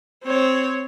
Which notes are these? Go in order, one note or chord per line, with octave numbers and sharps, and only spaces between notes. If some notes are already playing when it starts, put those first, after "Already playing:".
C4 C#5